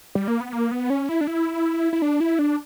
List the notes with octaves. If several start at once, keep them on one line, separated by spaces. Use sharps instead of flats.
G3
A#3
B3
A#3
B3
C#4
E4
D4
E4
E4
D4
E4
D4